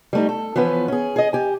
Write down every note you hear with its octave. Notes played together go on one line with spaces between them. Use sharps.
G3 A3 D#4
A4
E3 F3 B3 C#4 B4
C#4 G#4
G#4 D#5
G4 G#5